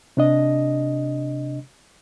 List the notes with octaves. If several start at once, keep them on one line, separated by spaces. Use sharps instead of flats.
C3 D4 D#5